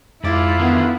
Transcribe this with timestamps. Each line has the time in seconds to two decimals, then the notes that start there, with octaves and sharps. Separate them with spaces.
0.24 F2 G#2 E4 F4 D5 D6 G#6
0.58 D3 D#3 B3 G#4